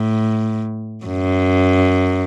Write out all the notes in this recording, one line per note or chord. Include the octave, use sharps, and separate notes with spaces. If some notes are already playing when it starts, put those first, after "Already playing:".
Already playing: A2
F#2